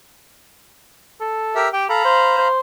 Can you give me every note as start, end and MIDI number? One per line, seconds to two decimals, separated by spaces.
1.21 1.63 69
1.55 1.68 67
1.55 1.68 70
1.55 1.68 76
1.73 1.88 67
1.73 1.85 79
1.89 2.01 69
1.89 2.48 77
1.89 2.48 82
1.89 2.48 83
2.05 2.36 72
2.37 2.60 72